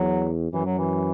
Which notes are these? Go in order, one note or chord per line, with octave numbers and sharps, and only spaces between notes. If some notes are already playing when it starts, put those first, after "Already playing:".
Already playing: E2 F#3
F#2 E3
F#3
E3